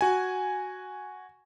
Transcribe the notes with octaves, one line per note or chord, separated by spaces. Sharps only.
F#4 G#5